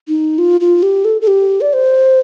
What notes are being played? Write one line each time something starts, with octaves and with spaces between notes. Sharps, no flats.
D#4
F4
F4
G4
A4
A4
G4
D5
C5